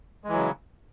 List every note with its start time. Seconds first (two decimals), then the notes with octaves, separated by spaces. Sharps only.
0.24 G#3
0.28 E3
0.33 F#3
0.37 C#3